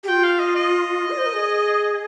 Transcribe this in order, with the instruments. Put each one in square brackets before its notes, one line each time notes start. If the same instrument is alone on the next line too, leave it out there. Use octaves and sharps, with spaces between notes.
[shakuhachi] G4
[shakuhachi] F4 [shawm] G5
[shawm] F5
D#5
D#5
[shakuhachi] D5
C5
A#4
G#4